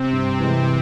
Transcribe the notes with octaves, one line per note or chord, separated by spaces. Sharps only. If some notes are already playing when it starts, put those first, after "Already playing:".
Already playing: C3 C4
G2
E3 G#3